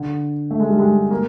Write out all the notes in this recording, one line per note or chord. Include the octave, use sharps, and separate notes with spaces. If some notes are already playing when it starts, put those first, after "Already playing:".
Already playing: D3
A3
G#3
G3
G#3
A#3